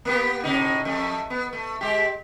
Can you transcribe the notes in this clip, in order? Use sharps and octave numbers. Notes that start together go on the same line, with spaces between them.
A#3 B3 G4
A2 C3 D#4
F2 A3
B3
A3
G#3 G4